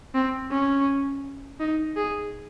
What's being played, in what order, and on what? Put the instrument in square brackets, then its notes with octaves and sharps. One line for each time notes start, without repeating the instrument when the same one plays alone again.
[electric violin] C4
C#4
D#4
G#4